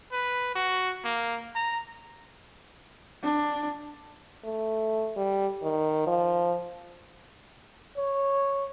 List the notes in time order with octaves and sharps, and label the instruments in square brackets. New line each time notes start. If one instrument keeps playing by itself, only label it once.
[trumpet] B4
F#4
A#3
A#5
[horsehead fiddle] D4
[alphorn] A3
G3
D#3
F3
[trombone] C#5